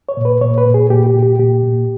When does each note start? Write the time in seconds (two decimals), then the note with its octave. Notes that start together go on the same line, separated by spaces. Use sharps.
0.09 C#5
0.17 A#2
0.25 B4
0.41 A#2 C#5
0.58 B4
0.66 A#2
0.74 G#4
0.90 A#2 G4
1.06 G4
1.15 A#2
1.23 G4
1.39 A#2 G4
1.63 A#2